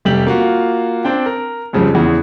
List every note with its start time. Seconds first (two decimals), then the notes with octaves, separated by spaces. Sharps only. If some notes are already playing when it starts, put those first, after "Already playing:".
0.05 F1 G3 G4 F#7
0.27 A#3 F4 F#4
1.04 C4 D4 G5
1.26 A#4
1.73 F2 C#3 F3 G3
1.94 E2 C#3